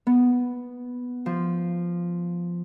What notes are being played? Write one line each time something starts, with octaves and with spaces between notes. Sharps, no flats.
B3
F3